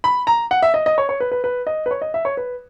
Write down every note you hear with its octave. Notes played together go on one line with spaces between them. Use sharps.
B5
A#5
F#5
E5
D#5
D#5
C#5
C#5
B4
B4
B4
D#5
B4
C#5
D#5
E5
C#5
B4